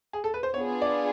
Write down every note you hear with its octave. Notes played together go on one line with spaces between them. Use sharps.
G#4
A4
B4
C5
B3 D4 F4 G#4 C#5
D5